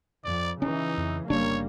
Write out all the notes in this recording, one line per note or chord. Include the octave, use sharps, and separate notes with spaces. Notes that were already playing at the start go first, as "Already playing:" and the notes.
F2 D5
C#3 E3 C#4 D#4
F2
G1 C#3 G3 A#3 D4 C#5